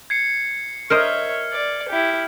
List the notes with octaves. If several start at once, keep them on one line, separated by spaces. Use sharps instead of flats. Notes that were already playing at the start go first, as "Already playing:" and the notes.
G#6 C7 C#7
A#4 C5 C#5 D#5 E5 F6
D5
E4 G4